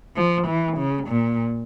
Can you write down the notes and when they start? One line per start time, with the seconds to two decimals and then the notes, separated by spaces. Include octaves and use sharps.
0.16 F3
0.47 E3
0.77 C#3
1.08 A#2